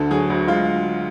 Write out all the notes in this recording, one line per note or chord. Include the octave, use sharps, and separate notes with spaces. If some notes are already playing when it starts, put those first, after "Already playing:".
Already playing: D2 D3 A4
F#3 G#4
D2
G#3 F4